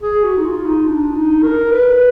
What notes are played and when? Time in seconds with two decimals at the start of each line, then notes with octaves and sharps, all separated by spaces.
0.02 G#4
0.24 F#4
0.37 D#4
0.45 F4
0.65 D#4
0.87 D4
1.15 D#4
1.43 A#4
1.71 B4